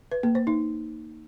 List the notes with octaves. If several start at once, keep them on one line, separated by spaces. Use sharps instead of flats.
B4
A#3
C5
D#4